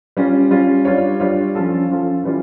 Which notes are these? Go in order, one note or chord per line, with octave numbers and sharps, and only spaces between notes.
G3 C#4 F4
G3 C#4 F4
G3 D4 F4 C#5
G3 D4 F4 C#5
F3 C#4 F4 A4
F3 C#4 F4 A4
E3 G3 C#4 F4